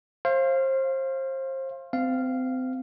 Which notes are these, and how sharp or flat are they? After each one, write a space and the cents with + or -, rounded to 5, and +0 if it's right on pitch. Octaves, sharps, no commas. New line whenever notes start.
C5 +30 F5 -20
C4 -30 F5 -10